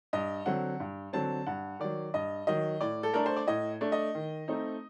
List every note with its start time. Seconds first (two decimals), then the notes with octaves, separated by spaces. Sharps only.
0.13 G2 D#5
0.46 D3 F#3 C4 F#5
0.80 G2
1.13 D3 F#3 C4 A5
1.47 G2 F#5
1.80 D#3 F#3 D5
2.14 G2 D#5
2.47 D#3 F#3 D#5
2.81 A2 D5
3.03 A4
3.14 A3 D4 A#4
3.26 C5
3.36 D5
3.47 A2 D#5
3.81 A3 D4
3.92 D#5
4.15 D#3
4.48 A3 C4 D#4